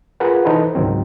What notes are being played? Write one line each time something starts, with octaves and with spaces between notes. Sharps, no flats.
F4 G#4 A#4 B4 F#5
E3 D#4 A4 B4 C5
C#2 G#2 D#3 F#3 C4